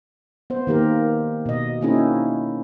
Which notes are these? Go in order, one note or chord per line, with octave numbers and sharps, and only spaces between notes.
B3 C5
D#3 A#3 G4 A#4
B2 D#5
A#3 C4 C#4 D#4 E4 G#4